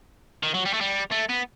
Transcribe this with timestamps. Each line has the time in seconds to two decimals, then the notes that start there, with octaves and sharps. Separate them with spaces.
0.43 D#3
0.54 F#3
0.66 G3
0.74 A3
0.81 G3
1.11 A3
1.29 B3